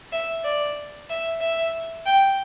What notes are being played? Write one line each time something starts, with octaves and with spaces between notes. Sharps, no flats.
E5
D5
E5
E5
G5